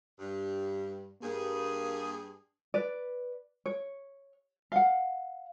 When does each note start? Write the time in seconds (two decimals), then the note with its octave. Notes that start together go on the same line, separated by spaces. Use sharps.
0.19 G2
1.22 G2 A#3 G#4
2.74 B4 D5
3.66 C#5
4.72 F5 F#5